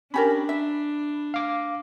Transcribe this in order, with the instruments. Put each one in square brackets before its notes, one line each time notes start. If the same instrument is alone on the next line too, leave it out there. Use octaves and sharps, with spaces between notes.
[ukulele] C#4 G4 A#4 [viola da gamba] D4 [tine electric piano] B5
[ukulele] E5
[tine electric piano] F5 D6